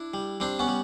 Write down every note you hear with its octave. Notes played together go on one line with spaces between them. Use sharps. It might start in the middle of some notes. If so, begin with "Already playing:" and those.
Already playing: D4 E4
G3
G3 C4 D4
B3 C#4
G3